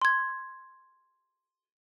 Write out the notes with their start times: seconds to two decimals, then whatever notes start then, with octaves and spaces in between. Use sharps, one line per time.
0.02 C6 G#6